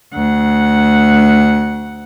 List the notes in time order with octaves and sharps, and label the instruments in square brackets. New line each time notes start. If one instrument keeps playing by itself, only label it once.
[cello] D2 F#5